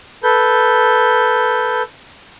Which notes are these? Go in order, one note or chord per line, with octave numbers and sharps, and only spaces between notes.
A4 B4 G6